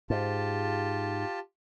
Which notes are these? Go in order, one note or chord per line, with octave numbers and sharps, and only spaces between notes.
G#2 F4 G4 A5